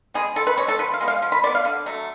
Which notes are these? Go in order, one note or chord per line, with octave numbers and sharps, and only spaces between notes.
G#3 B3 G#4
F3 A4
B4
G#3 B3 C#5
A4
F3 B4
F5
G#3 B3
F5
F3
B5
G#3 D5
B3
F5
D3
F#3 A3